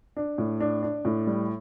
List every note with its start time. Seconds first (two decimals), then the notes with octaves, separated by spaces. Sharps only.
0.17 D4
0.38 A2
0.60 D4
0.83 D4
1.05 A2
1.27 G3